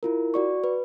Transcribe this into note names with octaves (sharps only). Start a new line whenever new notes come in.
E4 F4 A#4
F#4 D5 C#6
B4